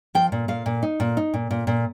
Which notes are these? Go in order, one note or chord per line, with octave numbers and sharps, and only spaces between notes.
F3 G5
A#2
A#2 F5
A#2
D#4
A#2
D#4
A#2
A#2
A#2